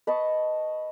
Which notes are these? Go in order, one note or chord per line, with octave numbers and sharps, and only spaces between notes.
B4 D#5 A5 C#6